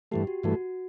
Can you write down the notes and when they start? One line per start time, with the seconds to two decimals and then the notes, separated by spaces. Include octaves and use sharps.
0.11 G2 E3 A3 G4
0.27 F#4
0.43 G2 E3 A3 F#4